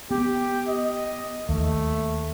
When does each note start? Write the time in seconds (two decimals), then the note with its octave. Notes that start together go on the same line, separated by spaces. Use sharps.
0.11 B3 G4
0.67 D#5
1.49 D#2 A3